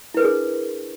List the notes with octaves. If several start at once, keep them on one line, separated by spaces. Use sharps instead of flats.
D4 E4 G#4 A#4 B4